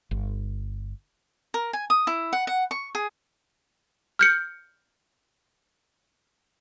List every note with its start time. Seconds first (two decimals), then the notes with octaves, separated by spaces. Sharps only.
0.11 G1
1.54 A#4
1.73 G#5
1.90 D#6
2.07 E4
2.33 F#5
2.47 F#5
2.71 C#6
2.95 G#4
4.19 F6 G6 C#7